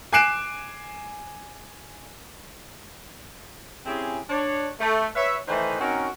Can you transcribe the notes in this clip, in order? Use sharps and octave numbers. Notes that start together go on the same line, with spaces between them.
G#5 D6 F#6 C7 D7 E7
C4 C#4 E4 G4 G#4
D4 C#5
A3
B4 C#5 E5
D#3 E3 A3 D#4 B4 C5
C4 C#4 D#4 F#4 A#4